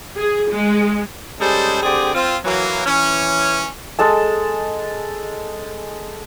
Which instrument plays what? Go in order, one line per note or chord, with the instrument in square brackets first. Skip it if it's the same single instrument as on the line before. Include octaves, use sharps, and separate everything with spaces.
[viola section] G#4
G#3
[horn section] G3 G#3 C#4 G#4 A4 C5
D3 C4 G4 G#4 D5
C4 F4
E3 F#3 A#3
E3 C#4
[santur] G#3 A4 A5